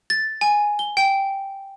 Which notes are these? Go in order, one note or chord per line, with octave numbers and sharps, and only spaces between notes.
A6
G#5
G7
G5